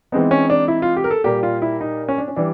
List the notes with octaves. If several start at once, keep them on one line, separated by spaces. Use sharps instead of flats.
E3 G#3 B3 C4 D#4
C#4
D4
E4
F4
G4
A#4
A4
A#2 G3 A#3 G4
F4
E4
D#4
C#4
D4
C#4
E3 G3 D4